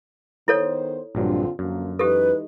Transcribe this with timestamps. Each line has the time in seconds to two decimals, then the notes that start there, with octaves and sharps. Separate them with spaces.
0.48 D#3 B3 E4 A4 C5 C#5
1.15 A#1 G2 D3 F#3 C4 F4
1.59 F#2 D3 F3 A#3
1.99 E3 G#3 D#4 G4 A4 B4